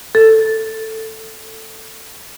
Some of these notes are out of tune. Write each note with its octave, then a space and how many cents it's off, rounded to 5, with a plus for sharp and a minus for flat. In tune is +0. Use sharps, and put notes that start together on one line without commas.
A4 +5